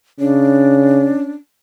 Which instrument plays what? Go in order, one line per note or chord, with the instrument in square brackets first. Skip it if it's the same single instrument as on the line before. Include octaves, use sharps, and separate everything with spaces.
[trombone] C#3 [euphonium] C#4 [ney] D4